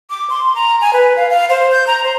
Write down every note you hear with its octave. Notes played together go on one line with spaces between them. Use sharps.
D6
C6
A#5
G#5
B4
F5
F5
C5
G6
A#5
C5